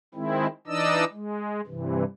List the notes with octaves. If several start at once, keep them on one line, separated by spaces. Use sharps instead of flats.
D#3 G#3 C4 E4
E3 D4 D#4 D5 D#5 E6
G#3
G2 C3 E3